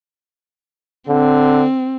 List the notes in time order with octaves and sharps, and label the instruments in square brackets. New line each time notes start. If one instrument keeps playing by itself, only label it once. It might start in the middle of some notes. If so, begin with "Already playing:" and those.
[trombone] D3 [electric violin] C4